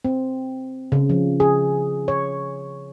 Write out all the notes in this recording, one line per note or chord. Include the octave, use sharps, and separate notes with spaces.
C4
C#3
F3
G#4
C#5